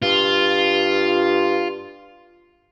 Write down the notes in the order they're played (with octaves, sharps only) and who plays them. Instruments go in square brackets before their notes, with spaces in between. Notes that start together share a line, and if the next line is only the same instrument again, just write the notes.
[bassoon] G2 [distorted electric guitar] F4